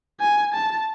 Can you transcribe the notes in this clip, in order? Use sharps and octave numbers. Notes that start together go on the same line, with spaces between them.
G#5
A5